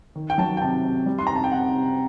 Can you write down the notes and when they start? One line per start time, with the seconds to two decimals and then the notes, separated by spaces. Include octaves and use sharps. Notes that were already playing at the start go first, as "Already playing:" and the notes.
0.15 D#3
0.30 G5
0.38 F#3 A5
0.57 G5
0.61 C3 A5
0.84 C3
1.06 G3
1.19 C6
1.27 C3 A#5
1.36 A5
1.44 G5
1.52 C3 F#5
1.74 C3